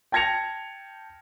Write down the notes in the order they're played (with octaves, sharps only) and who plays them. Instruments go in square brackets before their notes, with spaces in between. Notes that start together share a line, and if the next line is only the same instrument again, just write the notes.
[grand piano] G5 A5 G#6 A#6 C#7 F7